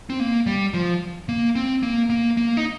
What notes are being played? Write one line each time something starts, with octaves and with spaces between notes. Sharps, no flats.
C4
A#3
G3
F3
A#3
C4
A#3
A#3
A#3
D#4